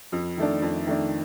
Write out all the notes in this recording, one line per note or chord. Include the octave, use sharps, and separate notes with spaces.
F2
D#3 A3 D4
F2
D#3 A3 D4